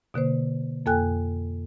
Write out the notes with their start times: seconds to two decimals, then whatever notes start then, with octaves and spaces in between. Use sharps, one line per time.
0.14 B2 D3 A#3 C5
0.86 F2 A#3 A4 G5 G#5 F#6